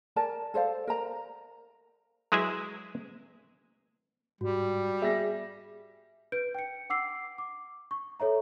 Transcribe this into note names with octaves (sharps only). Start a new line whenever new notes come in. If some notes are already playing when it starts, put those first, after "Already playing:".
A#4 D5 G#5 A5
A4 C5 D5 F5
A#4 C5 A#5
F#3 G#3 E4 G#4 B4 E5
G#2 G3 F#4
G#4 E5 A#6
B4 G6 D7
G5 C#7
F#5 D6 E6 C7
D6
C#6
A4 C#5 E5 A#5